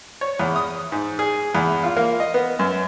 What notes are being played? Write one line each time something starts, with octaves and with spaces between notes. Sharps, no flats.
C#5
E2
D#6
G#2
G#4
E2
F4
A#3
D#5
B3
F#2